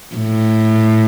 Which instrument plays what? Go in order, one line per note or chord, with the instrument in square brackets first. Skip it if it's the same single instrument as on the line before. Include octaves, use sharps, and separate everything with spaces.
[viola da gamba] A2